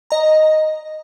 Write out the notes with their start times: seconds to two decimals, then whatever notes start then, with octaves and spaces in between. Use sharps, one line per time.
0.10 D#5 A#5